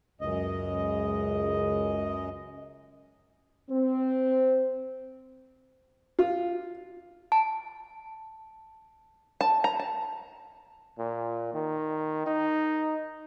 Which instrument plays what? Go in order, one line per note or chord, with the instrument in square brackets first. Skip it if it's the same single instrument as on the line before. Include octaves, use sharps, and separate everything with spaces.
[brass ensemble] C#2 [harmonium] F#2 D#5
[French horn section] C4
[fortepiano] F4
[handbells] A5
[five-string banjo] A5
A#5
A5
[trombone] A#2
D#3
D#4